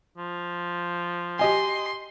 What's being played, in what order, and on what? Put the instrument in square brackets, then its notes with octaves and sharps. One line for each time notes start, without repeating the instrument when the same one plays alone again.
[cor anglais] F3
[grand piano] G4 D#5 G#5 [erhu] C6